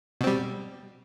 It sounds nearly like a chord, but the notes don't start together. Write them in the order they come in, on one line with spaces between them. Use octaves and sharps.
B2 C4 G3